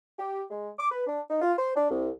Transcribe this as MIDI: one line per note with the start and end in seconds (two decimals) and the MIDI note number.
0.18 0.43 67
0.50 0.69 56
0.77 0.87 86
0.91 1.03 71
1.06 1.21 62
1.29 1.39 63
1.41 1.51 65
1.56 1.71 72
1.75 1.88 62
1.90 2.08 36